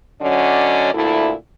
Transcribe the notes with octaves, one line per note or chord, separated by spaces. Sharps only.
D3 F#3 C#4 D5 D#5
D2 A#2 A3 E4